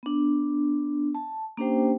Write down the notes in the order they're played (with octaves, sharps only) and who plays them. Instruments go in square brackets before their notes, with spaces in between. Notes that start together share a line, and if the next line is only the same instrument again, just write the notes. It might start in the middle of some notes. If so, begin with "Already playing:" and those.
[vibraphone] B3 D4
A5
A#3 C#4 D4 G4 C5 G5